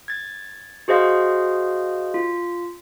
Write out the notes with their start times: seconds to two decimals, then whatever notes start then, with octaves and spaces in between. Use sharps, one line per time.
0.08 G#6 A6
0.88 F#4 G#4 C5 D#5 F5 C6
2.14 F4